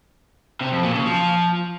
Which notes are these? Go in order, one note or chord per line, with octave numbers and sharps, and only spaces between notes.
C3
F2
A#2
C#3
F3